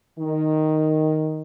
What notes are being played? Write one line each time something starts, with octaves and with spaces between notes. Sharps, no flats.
D#3